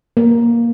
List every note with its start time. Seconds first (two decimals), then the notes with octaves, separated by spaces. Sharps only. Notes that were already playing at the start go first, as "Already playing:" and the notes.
0.17 A#3